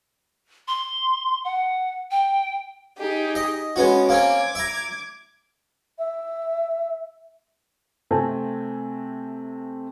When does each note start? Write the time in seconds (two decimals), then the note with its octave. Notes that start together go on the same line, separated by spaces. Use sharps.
0.68 C6
1.45 F#5
2.11 G5
2.98 D#4 G4 G#4
3.35 D#5
3.76 G#3 B3 C#4 F#4
4.09 A#3 C4 C#4 D6 G#6
4.55 E5 A#5
5.98 E5
8.11 C3 A3 C4 G#5 A5